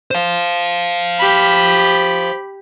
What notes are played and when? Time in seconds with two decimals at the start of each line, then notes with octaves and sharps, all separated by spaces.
0.11 C5 F5
1.19 G4 B5